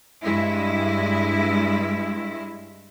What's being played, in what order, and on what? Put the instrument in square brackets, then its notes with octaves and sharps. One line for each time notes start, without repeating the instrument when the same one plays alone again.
[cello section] G2 G#3 E4